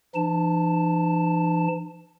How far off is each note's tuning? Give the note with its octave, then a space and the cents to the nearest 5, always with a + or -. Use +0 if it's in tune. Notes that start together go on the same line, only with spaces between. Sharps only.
E3 +45 D#4 -45 A5 +0